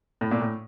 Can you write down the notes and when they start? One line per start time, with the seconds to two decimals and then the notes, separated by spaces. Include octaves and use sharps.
0.21 A2
0.31 A#2
0.41 A2